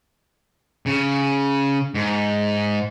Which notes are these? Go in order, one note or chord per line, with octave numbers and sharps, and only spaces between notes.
C#3
G#2